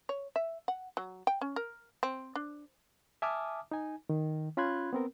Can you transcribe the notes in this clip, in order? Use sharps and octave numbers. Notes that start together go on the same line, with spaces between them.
C#5
E5
F#5
F#3
G5
C#4
A#4
C4
D4
E5 G#5 A5 D6 D#6 F6
D#4 G#5
D#3
C#4 F4 B5 C6 F#6 G#6
B3 C4 A#4